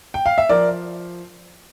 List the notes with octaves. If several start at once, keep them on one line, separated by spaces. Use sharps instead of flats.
G5
F5
E5
F3 A#4 D5